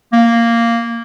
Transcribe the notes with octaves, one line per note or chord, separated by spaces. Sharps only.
A#3